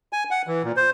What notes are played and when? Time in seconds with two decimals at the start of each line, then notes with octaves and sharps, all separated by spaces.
0.13 G#5
0.31 F#5
0.47 E3
0.64 A#2
0.77 C5